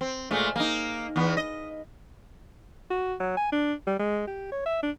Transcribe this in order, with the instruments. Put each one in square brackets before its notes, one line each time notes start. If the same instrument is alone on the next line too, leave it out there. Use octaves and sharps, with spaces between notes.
[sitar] C4
A#2 G#3 A3
A#3 D#4
E2 B3
D#5
[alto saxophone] F#4
F#3
G#5
D4
G3
G#3
G4
C#5
E5
D4